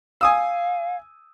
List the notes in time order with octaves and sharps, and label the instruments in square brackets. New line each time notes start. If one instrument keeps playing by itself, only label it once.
[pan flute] F5 [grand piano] G#5 D#6 E6